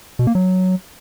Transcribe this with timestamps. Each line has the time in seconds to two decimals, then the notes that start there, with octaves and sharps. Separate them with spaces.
0.19 B2
0.27 A#3
0.35 F#3